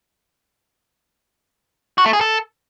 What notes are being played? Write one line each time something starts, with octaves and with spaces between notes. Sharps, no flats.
F#4
A3
G#4
A4